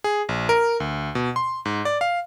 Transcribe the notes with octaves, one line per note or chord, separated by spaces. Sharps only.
G#4
A#1
A#4
D2
B2
C6
G#2
D5
F5